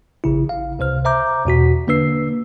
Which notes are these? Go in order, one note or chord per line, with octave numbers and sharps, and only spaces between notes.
A1 C#3 E4
F5
C#2 C3 C5 F6
C5 E5 A#5 D6 G6
E2 B2 F#4 B6
D3 A#3 D4 B4 E6 C7